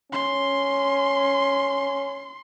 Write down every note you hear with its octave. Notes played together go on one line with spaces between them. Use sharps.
C#4 C6